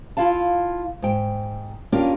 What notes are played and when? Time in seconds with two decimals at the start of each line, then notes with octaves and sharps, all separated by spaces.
0.17 E4 F4 F5 A5
1.02 G#2 G5
1.92 A#3 C#4 D4 F4 G4